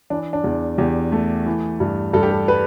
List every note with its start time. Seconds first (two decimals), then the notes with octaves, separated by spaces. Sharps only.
0.10 E3 D4
0.33 D4
0.44 E2
0.78 E2 G4
1.12 A3
1.46 E3
1.80 G2
2.13 G2 A4
2.23 G4
2.31 A4
2.48 G3 B4